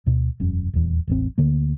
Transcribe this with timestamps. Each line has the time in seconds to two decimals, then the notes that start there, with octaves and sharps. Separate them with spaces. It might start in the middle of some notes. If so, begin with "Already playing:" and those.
0.06 D2 B2
0.40 E1 F#2 C#4
0.74 D#1 E2
1.07 E1 A1 C4
1.38 D2 D3 A#3